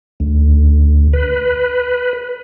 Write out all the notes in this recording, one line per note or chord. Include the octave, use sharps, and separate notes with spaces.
D2
B4